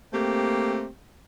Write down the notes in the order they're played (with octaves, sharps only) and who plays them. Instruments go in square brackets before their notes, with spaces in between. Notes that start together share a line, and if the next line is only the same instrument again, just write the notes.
[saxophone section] A3 A#3 C4 G4